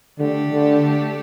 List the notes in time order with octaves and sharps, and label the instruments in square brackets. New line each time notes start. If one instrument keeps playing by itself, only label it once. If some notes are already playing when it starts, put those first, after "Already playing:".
[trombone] D3 [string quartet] A3 D4 G4
[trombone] D3